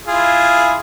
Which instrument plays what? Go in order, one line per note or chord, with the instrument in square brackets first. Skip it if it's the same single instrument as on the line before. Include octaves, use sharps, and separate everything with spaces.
[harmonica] E4 F4 G#4